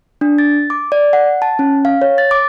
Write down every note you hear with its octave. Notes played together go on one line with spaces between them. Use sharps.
D4
A6
D6
D5
F#5
A5
C#4
F5
C#5
A6
D6